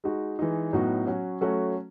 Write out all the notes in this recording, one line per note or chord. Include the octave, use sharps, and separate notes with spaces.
G#3 D#4 F#4
E3 G#3 D#4
A2 F#3 B3 D#4 F#4
F#3 C#4 F#4
F#3 A3 C#4 F#4 A4